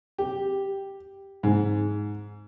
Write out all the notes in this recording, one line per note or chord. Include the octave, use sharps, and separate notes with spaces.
G4
G#2